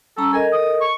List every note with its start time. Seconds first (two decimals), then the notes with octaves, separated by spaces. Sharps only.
0.17 G3 C#4 A4 A#5
0.33 A4 A#4 D#5 G#5
0.53 D#6
0.81 C#6